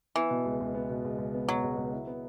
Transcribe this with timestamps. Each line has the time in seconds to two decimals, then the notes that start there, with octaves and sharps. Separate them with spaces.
0.15 E3 B3
0.30 B2
0.46 C#2
0.60 C#2
0.74 B3
0.89 B2
1.05 C#2
1.18 C#2
1.34 B3
1.48 B2 F#3
1.64 C#2
1.77 C#2
1.93 E4
2.07 B3